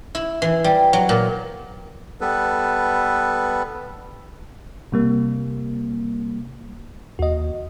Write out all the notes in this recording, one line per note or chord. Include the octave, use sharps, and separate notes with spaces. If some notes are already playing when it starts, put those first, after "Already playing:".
E4
E3
G3
F#3
A#2
G3 B3 A4 B4
C3 G3 A#3
D#2 F#4 D#5